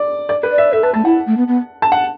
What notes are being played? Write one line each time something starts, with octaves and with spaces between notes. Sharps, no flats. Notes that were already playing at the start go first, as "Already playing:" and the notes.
Already playing: D5
D5
B4
D5
E5
A4 E5
B4 A5
A3 A5
E4 F#5
A3
B3
B3
A5
F#5